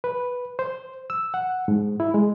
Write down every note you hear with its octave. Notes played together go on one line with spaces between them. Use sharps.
B4
C5
E6
F#5
G#2
E4
G#3